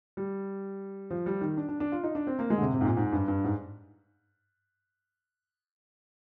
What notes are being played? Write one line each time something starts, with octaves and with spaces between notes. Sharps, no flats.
G3
F3
G3
D#3
D4
D4
D4
F4
D#4
D4
C4
A#3
G#3
D3
C3
C3
G#2
A#2
G#2
G2
G2
G#2